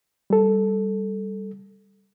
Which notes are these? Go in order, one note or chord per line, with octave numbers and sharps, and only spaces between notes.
G3 A4